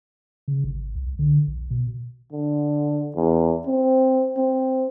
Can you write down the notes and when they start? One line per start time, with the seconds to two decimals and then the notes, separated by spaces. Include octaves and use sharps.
0.48 C#3
0.64 G#1
0.95 C2
1.19 D3
1.48 A#1
1.70 B2
2.32 D3
3.15 E2
3.66 C4
4.37 C4